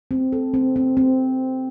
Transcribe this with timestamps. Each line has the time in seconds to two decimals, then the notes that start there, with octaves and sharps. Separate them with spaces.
0.11 C4
0.33 A4
0.54 C4
0.76 C4
0.97 C4